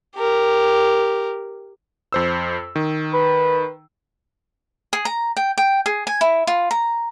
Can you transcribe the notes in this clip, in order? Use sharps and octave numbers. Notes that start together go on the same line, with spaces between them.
G4 A#4
F2 C5 E6
D#3
B4
G#4
A#5
G5
G5
G#4
G#5
E4
F4
A#5